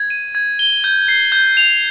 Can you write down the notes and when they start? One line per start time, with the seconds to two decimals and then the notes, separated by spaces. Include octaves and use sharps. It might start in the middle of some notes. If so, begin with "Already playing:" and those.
Already playing: G#6
0.10 D#7
0.35 G#6
0.59 G7
0.84 G6
1.08 C7
1.32 G6
1.57 F7